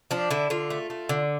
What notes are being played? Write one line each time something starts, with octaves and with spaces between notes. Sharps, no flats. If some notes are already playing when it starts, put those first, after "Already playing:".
F3 D4
D3 E4
D3 F4
A3
A3
D3